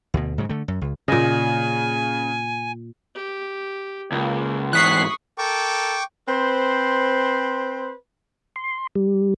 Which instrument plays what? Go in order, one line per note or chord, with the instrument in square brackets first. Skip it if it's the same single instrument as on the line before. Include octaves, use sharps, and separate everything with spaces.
[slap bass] D2 B2
G#2 C#3 F#3
D3 A3
F#2
C#2
[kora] A#2 D#5 [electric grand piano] C#3 [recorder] G#5
[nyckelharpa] G4
[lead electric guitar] C#2 [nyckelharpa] A#3
[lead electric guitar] G#2 E3 [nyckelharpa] C#6 D#6 [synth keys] F#6 B6 C7
[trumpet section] A4 A#4 [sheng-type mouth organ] G5 C#6 D6
[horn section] C4 B4 C5
[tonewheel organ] C6
G3